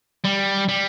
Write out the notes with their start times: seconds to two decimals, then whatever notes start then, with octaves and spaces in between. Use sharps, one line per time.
0.24 G3
0.68 G3